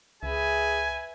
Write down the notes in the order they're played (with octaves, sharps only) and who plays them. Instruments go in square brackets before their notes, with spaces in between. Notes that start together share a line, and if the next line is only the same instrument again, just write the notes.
[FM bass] C#2 [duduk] G#4 [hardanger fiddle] B4 E5 [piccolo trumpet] G#5